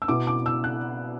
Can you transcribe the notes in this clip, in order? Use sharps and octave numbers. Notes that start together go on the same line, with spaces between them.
E6
B2 B3 E4 D6
D6
E6
F#6